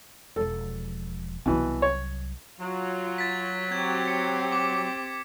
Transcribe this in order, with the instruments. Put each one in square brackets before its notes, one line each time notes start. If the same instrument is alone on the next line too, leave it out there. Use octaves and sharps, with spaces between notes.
[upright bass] E1 F3 [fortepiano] A4
[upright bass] C2 F#3 [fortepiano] B2 E3
[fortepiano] C#5
[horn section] F#3 [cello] F4
[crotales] A6 B6
[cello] C4 G4 [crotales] G#6
[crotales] C#7
D6